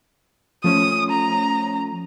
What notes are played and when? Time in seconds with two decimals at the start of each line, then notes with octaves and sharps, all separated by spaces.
0.64 F3 A3 C#4 D#6
1.10 A#5